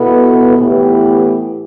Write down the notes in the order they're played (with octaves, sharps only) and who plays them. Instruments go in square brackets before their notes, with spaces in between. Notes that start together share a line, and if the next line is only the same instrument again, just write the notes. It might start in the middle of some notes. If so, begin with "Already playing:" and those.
Already playing: [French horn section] B2 B3 E4 A4
A2 E3 B3 E4 G4